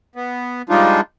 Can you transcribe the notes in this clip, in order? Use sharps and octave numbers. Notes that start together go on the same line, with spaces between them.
B3
F3 G3 G#3 D4 D#4 F4